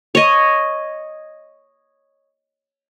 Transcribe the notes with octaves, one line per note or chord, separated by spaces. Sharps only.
C#5 D#5